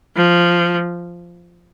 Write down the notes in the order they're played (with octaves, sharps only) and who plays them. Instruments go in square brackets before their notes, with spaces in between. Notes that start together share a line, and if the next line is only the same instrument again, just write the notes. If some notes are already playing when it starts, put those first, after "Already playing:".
[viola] F3